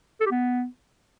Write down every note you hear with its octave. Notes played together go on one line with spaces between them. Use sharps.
A4
G4
B3